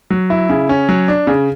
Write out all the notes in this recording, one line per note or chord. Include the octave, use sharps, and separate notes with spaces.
F#3
E4
C#3
C#4
F#3
D4
C#3